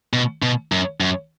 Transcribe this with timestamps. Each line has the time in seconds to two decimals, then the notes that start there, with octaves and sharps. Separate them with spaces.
0.13 B2
0.42 B2
0.72 F#2
1.00 F#2